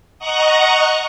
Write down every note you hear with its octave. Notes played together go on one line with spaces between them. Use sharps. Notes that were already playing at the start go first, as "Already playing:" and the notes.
D#5 F#5 A#5 C#6 F#6